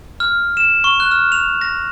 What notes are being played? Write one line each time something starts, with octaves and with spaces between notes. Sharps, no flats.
F6
E7
C#6
F#6
F6
F7
A#6